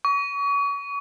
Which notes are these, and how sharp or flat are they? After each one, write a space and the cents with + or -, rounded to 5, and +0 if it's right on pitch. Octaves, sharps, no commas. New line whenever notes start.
C#6 +35